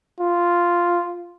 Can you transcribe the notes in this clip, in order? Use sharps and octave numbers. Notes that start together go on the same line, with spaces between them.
F4